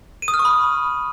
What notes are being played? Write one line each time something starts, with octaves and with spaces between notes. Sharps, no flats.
D#7
D#6
F6
C#6
B5